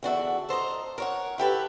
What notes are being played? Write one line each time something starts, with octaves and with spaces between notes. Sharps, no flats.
E2 D3 F#4 E5
A4 C5 D#5 A#5
A#4 C#5 F#5
E4 G4 A4 B4